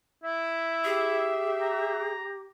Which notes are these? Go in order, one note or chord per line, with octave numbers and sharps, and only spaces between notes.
E4 E5
G4 G#4
A#5